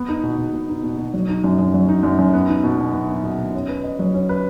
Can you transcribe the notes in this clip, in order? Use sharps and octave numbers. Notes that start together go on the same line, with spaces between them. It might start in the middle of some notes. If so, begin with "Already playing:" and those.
Already playing: B3
D#4
B2
B2
B3
D#4
B2
B2
F#3
D#4
F#2
F#2
F#3
D#4
F#2
F#2
B3
D#4
B2
B2
B3
D#4
B2
B2
C#4
B4
D#5
F#3
C#4
B4